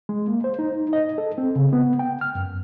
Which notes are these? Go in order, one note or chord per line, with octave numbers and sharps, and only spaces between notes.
G#3
A#3
C5
D#4
D#5
A4
C4
C#3
B3
G5
F6
F#2